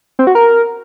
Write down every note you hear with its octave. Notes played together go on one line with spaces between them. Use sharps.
C4
F#4
A#4